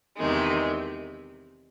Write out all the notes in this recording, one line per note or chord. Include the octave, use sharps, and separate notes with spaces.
E2 C3 D#3 G#3